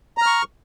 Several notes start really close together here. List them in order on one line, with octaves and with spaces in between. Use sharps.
A#5 F6 C#6